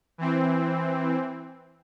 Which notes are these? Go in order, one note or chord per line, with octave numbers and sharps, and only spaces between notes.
E3 C4